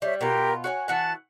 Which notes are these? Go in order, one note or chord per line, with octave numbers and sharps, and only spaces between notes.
G3 C#5 E5
B2 F4 G4 A#4 G5
F#4 C#5 F#5 G#5
E3 F#4 F#5 A5